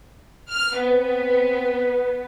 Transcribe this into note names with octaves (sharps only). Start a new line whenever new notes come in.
F6
B3 C4